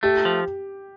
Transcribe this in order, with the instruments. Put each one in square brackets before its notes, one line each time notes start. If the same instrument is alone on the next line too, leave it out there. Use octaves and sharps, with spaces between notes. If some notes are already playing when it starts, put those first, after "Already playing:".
[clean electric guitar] A3 [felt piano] G4
[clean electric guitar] F3